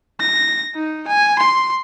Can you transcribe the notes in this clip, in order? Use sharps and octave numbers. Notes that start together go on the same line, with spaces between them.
A#6
D#4
G#5
C6